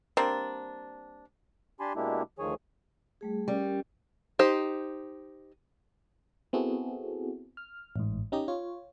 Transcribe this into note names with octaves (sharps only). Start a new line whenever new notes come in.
G3 A#3 C4 D4
D4 G4 G#5 A5 B5 C6
B2 G#3 A#3 D4 E4 G4
D2 D#3 F3 G#4 C#5 G#5
G3 A3 G#4
G3 C#4 A#4
D#4 G4 C5
B3 C4 E4 F#4 G#4 A4
F6
A1 G#2
C#4 D#4 G4 D#5
F4 C#5